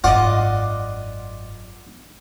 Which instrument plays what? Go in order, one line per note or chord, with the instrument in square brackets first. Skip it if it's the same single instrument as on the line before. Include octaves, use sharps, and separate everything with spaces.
[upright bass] G#1 F#2 [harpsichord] F4 F#5 [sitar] D5 D#5